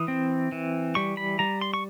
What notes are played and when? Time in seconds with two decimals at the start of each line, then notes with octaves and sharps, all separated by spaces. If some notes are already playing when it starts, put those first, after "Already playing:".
Already playing: E3 D#6
0.08 C4
0.52 E3
0.95 G3 C#6
1.17 B5
1.39 G3 A#5
1.61 C6
1.74 C#6